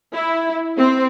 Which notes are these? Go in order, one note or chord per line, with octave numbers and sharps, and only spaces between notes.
E4
C4